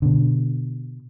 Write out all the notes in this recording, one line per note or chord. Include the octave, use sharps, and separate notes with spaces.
B2 D3